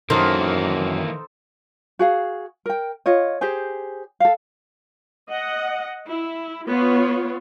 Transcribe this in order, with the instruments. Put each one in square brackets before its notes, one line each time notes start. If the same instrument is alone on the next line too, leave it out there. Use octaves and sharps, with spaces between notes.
[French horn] F#2 [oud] D#3 [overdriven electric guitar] E3 A#3 [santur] D#4 A4 C5
[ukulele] F#4 G#4 F5
A#4 G5
F4 C#5 D#5
G4 G#4 C5 G#5
A4 F5
[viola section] D#5 F#5
E4
B3 F4 C#5